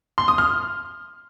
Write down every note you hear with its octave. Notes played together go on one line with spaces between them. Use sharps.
C6
D#6
F6